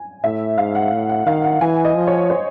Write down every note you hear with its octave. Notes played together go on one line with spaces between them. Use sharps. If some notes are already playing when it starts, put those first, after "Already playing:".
Already playing: G#5
A2 E5
G#2 F5
F#5
A2
F#5
D#3 F5
F#5
E3 G#5
D#5
F3
C#5
C5